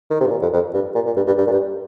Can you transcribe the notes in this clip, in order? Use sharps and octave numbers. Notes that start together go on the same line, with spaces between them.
D#3
C3
G2
A#2
F2
F2
G2
A#2
A#2
G2
G2
G2
A#2
G2